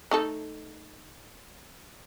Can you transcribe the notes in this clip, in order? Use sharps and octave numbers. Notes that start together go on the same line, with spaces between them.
A3 D#4 A4